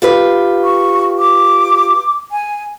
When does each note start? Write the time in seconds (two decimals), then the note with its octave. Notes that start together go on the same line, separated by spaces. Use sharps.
0.02 F4 G4 B4
0.64 C#6
1.18 D6
2.31 G#5